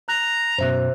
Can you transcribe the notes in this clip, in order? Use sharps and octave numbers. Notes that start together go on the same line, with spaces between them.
A#5 F#6
F#2 B2 C5 E5 F#6